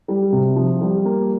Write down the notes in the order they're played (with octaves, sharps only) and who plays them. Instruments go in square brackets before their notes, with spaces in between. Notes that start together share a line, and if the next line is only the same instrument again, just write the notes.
[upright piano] G3
C3
F3
G3
A#3